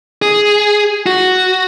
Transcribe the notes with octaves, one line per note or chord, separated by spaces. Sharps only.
G#4
F#4